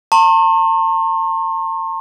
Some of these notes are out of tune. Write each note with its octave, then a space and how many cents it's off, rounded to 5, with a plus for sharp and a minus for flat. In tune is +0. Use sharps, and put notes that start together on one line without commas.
A5 +45 C6 +45